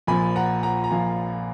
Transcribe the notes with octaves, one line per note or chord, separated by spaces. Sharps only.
A#1 A#2 F3 G#5 B5
F#5 A#5
F#5 A#5
A#5
A#1 A#2 F3 F5 G#5